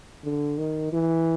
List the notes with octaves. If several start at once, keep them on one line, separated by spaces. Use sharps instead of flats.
D3
D#3
E3